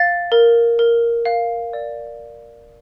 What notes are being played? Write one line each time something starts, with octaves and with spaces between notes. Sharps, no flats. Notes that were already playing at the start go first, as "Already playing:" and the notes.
Already playing: F5 A6
A#4
A#4
F5
D5